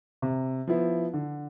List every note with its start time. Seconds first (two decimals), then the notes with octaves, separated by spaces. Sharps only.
0.22 C3
0.67 F3 B3 E4
1.13 D3